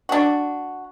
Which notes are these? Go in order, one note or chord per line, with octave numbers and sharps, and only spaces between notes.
D4 F#4